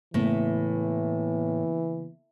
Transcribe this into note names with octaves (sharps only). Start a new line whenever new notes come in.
A2 C#3 E3 A#3 B3